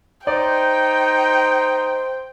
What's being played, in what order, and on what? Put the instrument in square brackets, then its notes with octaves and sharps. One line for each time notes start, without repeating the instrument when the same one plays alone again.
[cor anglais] D#4 [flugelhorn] C5 [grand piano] D5 [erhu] G5